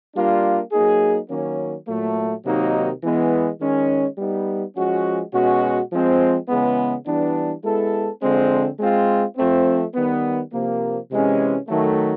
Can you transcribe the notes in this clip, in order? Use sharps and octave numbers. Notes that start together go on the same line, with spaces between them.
G3 A#3 D4 F4
F#3 A#3 D#4 G#4
D#3 F#3 A#3 C#4
A#2 F#3 A3
C3 D#3 F#3 A#3 D#4
E3 G#3 B3
D#3 G#3 C#4
G3 B3 D#4
F3 G#3 C#4 F#4
B2 G#3 C#4 F#4
F3 G#3 C4
C#3 E3 G#3 B3
E3 G3 B3 D4
G#3 B3 E4 A4
D3 F3 G#3 C4
G#3 C4 F4
F3 A3 C4
D#3 G3 B3
C3 F3 A#3
C3 E3 G#3 C#4
D#3 F#3 A3